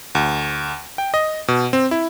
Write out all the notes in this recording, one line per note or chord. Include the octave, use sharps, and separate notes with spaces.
D2
G5
D#5
B2
C4
E4